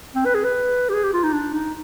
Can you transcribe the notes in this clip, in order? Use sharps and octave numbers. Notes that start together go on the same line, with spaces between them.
C4
B4
G#4
B4
G4
G#4
G4
F4
D#4
D4
D#4